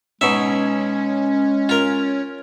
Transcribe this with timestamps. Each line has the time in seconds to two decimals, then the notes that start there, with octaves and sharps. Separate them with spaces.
0.21 B2 G#3 C#4 D#4 E5
1.69 F4 A#4